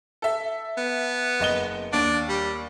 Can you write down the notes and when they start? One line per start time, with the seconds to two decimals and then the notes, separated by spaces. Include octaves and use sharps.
0.22 A4 E5
0.77 B3
1.40 F#1 D#5 G7
1.93 D#2 D4 A6 D7
2.29 G3